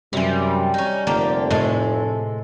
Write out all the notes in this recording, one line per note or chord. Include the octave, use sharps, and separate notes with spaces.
F#2 C3 E3 G3
C#4 D#4
F1 D3 A#3 G4
A2 C3 G#3 A4